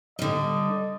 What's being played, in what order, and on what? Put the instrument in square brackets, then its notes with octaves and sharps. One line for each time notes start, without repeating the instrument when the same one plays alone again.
[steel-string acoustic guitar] D3 G3 [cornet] D#5